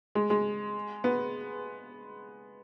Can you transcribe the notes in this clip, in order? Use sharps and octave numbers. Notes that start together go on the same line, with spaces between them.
G#3
G#3
B3